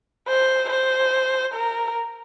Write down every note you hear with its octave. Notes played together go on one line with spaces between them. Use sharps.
C5
C5
A#4